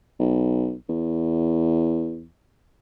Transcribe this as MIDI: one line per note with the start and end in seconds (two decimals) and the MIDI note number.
0.19 0.75 35
0.89 2.28 40